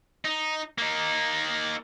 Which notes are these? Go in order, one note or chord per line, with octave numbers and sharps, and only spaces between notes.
D#4
A#3 D#4